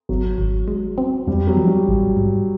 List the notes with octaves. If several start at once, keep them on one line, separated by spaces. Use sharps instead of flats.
G#1 F#3
G#1
G#3
C4
F2 G3
F#3
F3
G3
A1
G#2